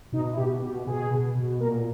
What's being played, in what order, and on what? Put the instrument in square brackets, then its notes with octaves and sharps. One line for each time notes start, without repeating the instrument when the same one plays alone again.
[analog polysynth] B2 D#4
E4
B2 G4
B2 G4
B2 G#4
B2
B2
A#2 A#4